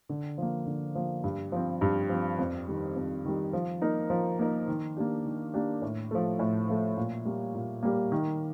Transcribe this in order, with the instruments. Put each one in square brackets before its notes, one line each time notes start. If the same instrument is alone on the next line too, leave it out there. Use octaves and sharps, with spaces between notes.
[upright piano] D3
F3 A#3
D3
F3 A#3
G2
F3 C4
G2
F3 C4
F2
D#3 G3
F2
D#3 G3
F3
A#3 D#4 A#4
F3
A#3 D#4 A#4
D#3
A#3 D4 G4
D#3
A#3 D4 G4
A2
F3 A3
A2
F3 A3
A#2
G3 A#3
A#2
G3 A#3
D#3